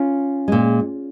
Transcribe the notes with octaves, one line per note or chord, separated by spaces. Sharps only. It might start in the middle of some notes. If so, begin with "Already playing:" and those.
Already playing: C#4 F4
A#2 G#3